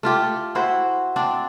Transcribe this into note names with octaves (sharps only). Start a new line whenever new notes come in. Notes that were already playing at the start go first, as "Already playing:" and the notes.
A3 F4 G4
E4 F#4 C5
C4 D4